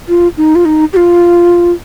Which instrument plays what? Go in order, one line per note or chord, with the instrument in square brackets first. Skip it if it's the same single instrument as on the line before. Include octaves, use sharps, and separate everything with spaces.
[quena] F4
D#4
F4
D#4
G4
F4